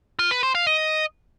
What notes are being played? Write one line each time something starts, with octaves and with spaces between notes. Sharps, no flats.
F4
B4
C5
F5
D#5